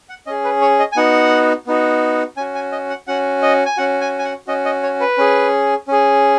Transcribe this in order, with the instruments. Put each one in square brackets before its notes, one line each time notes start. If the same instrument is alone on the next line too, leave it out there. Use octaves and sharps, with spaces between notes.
[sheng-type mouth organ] F#5
C#4 G#4 D#5
B4
C#5
D#5
G#5
B3 D#4 F#4 F#5
B3 D#4 F#4
C#4 F#4 G#5
G#5
D#5
F#5
C#4 F#4 F#5
D#5
G#5
C#4 F#4 F#5
G#5
G#5
F#5
C#4 F#4 D#5
D#5
C#5
B4
C#4 G#4
C#4 G#4